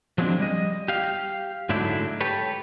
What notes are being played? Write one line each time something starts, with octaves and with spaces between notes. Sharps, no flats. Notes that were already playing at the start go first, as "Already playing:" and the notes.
F3 F#3 G#3 B3 C4 D4
G3 D#5
G4 F5
G#2 D3 F#3 A3 D4 E4
G4 A4 B4 C#5